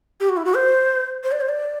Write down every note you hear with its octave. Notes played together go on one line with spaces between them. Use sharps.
G4
F#4
E4
F#4
C5
C5
D5
C5
D5